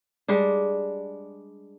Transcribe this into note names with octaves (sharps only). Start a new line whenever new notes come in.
G3 G#3 D4